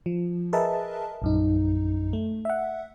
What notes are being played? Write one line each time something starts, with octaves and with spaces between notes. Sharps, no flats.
F3
G#4 A#4 B4 D#5 E5 A5
A#1 F#2 D#4
A3
E5 F#5